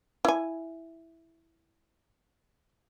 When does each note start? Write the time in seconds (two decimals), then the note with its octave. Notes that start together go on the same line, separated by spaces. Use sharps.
0.25 E4 G#5